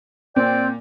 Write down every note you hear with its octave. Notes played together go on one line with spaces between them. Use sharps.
A#2 C4 D5 G5